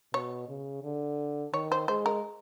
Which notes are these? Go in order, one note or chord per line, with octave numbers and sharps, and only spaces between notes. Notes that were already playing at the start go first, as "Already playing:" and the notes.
B2 C#5
C#3
D3
D#3 C#5
C5
G#3 C5
A#4